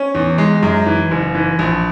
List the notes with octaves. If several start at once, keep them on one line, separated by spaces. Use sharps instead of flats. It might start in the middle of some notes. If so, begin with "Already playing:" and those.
Already playing: C#4
E2
G#3
F#2
E3
F#1
E3
A#1